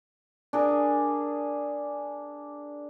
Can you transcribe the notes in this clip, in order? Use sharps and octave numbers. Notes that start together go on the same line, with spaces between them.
D4 G#4 A#4